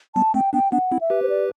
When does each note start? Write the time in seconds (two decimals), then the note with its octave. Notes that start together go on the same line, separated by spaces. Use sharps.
0.15 G3 B3 A5
0.34 A3 C4 G5
0.53 B3 D4 G5
0.72 B3 D4 F#5
0.91 C4 E4
1.01 E5
1.10 G4 B4
1.22 C5
1.30 D5